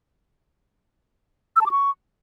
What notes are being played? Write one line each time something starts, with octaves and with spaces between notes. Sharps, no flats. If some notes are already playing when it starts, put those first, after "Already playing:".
E6
A5
D6
C#6